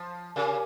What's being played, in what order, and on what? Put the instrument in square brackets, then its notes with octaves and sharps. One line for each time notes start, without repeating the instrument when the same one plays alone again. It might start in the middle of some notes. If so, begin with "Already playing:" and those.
Already playing: [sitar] F3
[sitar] C#3 [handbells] G4 A#4 F5 G#5